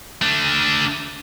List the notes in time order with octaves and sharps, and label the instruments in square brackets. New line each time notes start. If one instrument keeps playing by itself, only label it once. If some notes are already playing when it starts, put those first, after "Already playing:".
[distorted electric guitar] A3 D4